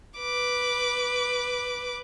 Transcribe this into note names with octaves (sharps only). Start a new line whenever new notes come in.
B4 D6